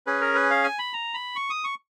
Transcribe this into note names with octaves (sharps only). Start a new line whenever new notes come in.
C#4 G#4 B4
A#4
B4
F5
G#5
B5
A#5
B5
C#6
D#6
C#6